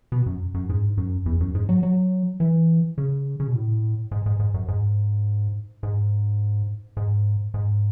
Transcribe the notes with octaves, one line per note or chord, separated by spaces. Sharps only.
B2
F#2
F#2
G#2
F#2
E2
F#2
G#2
F#3
F#3
E3
C#3
C#3
B2
A2
G#2
G#2
G#2
F#2
G#2
G#2
G#2
G#2